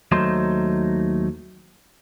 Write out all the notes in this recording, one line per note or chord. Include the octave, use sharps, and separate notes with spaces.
D#2 F#3 A3 D#4 C5 C6